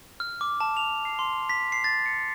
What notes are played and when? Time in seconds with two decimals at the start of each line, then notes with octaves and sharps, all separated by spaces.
0.20 F6
0.41 D6
0.61 A5
0.77 F7
1.05 C7
1.19 C6
1.49 B6
1.72 C7
1.84 A6
2.06 C#7